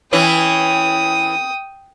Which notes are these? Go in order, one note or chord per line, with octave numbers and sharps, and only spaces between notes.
E3 C#4 E4 G5 D#6